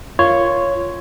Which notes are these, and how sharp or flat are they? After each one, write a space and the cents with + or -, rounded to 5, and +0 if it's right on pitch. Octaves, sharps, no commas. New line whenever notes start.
F4 -10 A#4 +10 C#5 +0